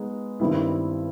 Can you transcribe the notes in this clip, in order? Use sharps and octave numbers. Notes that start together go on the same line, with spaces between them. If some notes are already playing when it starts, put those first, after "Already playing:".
Already playing: G#3 B3 D#4
G2 D#3 G3 C4 E4